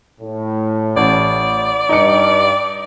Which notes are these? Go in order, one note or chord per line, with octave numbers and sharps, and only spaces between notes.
A2
A1 D5
G2 D#4 C#7